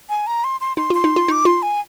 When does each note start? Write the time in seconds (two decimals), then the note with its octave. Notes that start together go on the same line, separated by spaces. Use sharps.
0.09 G#5
0.27 A#5
0.44 C6
0.61 C6
0.77 D#4 C6
0.90 F4 C6
1.04 D#4
1.16 F4
1.28 D#4 D6
1.45 F4 C6
1.62 G#5